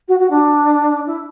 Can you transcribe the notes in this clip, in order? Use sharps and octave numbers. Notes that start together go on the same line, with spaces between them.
F#4
F#4
D4
E4